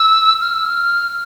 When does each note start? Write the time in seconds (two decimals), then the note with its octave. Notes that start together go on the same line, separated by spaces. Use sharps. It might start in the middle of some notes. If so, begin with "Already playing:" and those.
Already playing: E6
0.41 F6
0.54 E6
0.66 F6